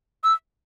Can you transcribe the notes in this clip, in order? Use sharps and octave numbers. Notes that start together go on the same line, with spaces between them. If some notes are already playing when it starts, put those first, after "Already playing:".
E6